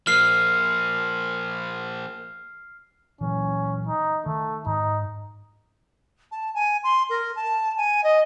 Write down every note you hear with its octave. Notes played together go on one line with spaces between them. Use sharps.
F3 A#3 F6 C7
A#2 E3 F#3 C#4
D#4
D#3 A3
G#2 D#4
A5
G#5
C6
A#4
A5
G#5
D#5